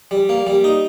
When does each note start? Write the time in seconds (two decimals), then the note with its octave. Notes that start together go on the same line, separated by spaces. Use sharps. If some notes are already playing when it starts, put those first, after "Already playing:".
0.11 G3
0.29 A#3
0.47 G3
0.64 D#4